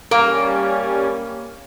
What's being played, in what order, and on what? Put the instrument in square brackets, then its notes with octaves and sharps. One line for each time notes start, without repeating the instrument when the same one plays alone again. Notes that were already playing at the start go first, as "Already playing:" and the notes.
[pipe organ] G3 C#4 [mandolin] A#3 [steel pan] A#4